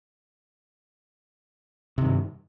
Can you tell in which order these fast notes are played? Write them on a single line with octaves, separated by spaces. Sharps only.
C3 D#3 G2